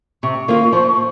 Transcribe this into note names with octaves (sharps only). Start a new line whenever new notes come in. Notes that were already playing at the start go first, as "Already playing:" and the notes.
C3 C#6
D#3 A#3 F4
F3